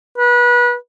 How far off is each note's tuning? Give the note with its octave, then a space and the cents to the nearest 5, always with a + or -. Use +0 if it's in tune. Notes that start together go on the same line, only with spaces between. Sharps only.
B4 -25